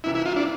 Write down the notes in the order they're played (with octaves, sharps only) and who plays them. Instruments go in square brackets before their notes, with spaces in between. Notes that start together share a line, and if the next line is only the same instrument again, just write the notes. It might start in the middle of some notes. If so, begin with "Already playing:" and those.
[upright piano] C2 C3 E3 [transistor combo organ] E4
[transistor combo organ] E4
F4
D4